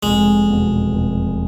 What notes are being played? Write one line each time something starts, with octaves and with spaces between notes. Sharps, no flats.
F1 G#3
E2 B2
F1